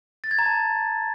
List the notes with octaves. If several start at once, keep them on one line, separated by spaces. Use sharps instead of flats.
A6
G#6
A#5
A5